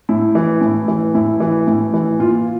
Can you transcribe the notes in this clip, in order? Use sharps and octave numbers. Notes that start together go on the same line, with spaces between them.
A2 E4
E3
A2
E3
A2 E4
E3
A2
E3
A#2 F4